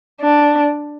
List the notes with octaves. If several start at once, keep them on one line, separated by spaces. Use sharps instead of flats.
D4